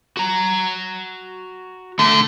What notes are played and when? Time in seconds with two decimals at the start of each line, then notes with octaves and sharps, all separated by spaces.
0.17 F#4 A#5
1.99 D3 A3